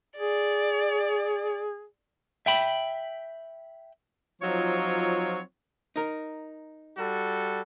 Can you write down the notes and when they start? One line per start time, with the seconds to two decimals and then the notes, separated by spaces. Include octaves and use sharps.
0.18 G#4 D5
2.46 E5 G5 B5
4.42 F3 F#3 C4 D#4 F4 C#5
5.96 D#4 A#4
6.98 G3 F#4 A4